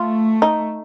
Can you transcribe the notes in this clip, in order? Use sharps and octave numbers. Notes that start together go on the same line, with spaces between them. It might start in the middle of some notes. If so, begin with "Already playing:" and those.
Already playing: A3 F4
D#4